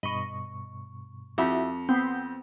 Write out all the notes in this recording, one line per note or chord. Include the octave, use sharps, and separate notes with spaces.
G2 B2 D#5 B5 C#6
F2 E4 F#4 G4 E5
B3 C4 G6